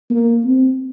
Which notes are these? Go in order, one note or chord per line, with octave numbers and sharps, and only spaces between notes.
A#3
C4